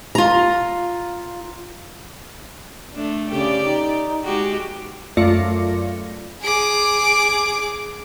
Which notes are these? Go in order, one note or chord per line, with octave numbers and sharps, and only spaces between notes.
F4 A#5
A3 D4
C#3 G4 D5
D#4
G#3 F#4 G4
F#2 A3 F4 D5 A#6 C#7
G#4 D6